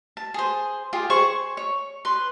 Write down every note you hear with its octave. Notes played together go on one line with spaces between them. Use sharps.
A5
G#4 C5
F4 G4 G#4
G#4 C5 C#6
C#5
B4 C6